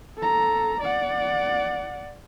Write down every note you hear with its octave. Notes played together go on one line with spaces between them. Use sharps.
A4 A#5
D5 F#5